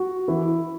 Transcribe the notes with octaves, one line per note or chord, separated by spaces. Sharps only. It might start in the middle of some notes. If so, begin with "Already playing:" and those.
Already playing: F#4
E3 E4